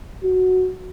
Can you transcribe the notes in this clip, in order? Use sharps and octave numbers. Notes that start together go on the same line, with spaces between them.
F#4